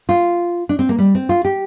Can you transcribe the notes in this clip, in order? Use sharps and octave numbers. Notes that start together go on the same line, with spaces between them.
F4
D4
C4
A#3
G3
C4
F4
G4